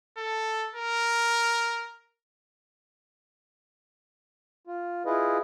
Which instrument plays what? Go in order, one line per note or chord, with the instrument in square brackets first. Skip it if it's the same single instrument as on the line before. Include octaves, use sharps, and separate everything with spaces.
[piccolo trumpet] A4
A#4
[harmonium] F4
E4 F4 G#4 B4 D#5